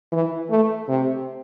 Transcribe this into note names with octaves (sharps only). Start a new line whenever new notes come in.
E3
A3
C3